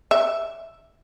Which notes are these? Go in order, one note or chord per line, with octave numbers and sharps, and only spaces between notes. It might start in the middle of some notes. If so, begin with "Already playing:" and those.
E5